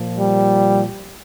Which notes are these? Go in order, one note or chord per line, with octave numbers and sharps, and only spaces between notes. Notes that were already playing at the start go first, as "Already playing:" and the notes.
Already playing: A#2 F3
G3